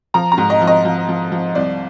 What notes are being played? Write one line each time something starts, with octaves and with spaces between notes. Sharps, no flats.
F3 A#5
A#5
G#2
D#5
F3
D#5
F3
F3
F3
C2 D5